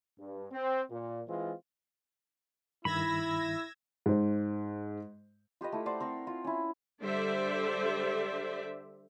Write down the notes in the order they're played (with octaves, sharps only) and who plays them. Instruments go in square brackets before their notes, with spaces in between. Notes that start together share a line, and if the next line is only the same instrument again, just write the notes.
[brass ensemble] G2
C4
A#2
E3 G#3 C4 F4
[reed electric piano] G2 D#3 [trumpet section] E4 [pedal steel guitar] B5 [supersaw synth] E6 G#6 A#6
[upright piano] G#2 C5
[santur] F4 G4 B4 D#5
A3 E4
C5 D5 F#5 D6
C4 A#4 C6 C#6
F4
C#4 E4
[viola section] D3 G3 C5 D5 E5